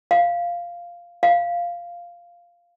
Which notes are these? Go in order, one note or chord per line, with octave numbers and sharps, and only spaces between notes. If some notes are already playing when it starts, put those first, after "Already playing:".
F5
F5